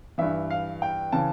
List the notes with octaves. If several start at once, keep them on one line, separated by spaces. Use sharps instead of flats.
G2 E3 E5
F5
G5
C#3 E3 A5